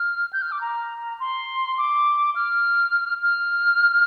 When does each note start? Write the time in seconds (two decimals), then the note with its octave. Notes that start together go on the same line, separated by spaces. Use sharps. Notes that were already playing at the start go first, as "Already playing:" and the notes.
Already playing: F6
0.33 G6
0.42 F6
0.52 D6
0.61 A#5
1.20 C6
1.78 D6
2.36 F6
3.23 F6